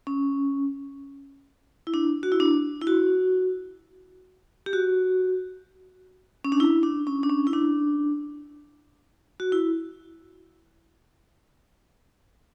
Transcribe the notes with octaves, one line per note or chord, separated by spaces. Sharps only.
C#4
E4
D4
F#4
E4
D4
E4
F#4
G4
F#4
C#4
D4
E4
D4
C#4
D4
C#4
E4
D4
F#4
E4